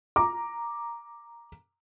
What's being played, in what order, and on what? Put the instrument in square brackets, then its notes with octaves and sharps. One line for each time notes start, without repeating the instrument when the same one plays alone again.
[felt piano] A#5 D6